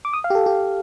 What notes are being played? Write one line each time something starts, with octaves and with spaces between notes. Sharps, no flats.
D6
D#6
F5
G4
A4
G4